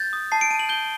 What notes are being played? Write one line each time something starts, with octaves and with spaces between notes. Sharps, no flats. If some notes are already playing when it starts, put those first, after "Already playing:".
Already playing: G6 A6
D#6
A5 C7
D7
A5 D#7
F#7
G6 G7